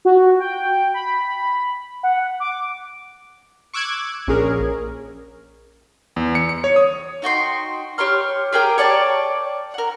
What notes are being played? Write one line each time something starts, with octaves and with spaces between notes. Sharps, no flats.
F#4
G5
B5
F#5
D6
C#6 D6 E6 F#6 G#6
A#1 C#4 G#4 A#4
E2
C#7
C#7
C#5
D#6
D#4 F#4 G5 C6
G4 C#5 C6 F6
G4 G#4 A#4 G5
C#5 D5 G5 A5
A#4 F#5